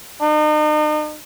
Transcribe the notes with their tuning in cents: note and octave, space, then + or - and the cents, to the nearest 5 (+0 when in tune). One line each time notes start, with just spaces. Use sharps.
D#4 -40